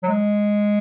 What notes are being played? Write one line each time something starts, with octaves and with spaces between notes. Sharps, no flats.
F#3
G#3